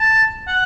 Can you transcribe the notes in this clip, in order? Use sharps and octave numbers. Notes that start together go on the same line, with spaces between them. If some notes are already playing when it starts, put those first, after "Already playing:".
Already playing: A5
F#5